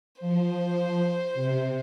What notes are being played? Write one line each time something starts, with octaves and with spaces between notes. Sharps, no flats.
F3 C5
C3